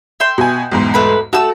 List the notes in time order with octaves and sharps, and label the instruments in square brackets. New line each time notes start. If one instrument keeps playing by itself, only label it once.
[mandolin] E5 G5 C6
[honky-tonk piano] B2 G#5
B1 E2 G#2
[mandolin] A3 B4 B5
[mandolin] A3 A5 E6 [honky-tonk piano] F#4